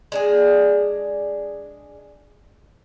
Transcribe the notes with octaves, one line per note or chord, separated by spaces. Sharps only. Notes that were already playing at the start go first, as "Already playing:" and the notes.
G#3 D4 G#4